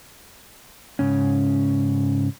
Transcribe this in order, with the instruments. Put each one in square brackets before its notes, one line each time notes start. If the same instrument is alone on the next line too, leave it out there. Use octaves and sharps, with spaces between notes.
[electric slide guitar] G#2 C#3 C#4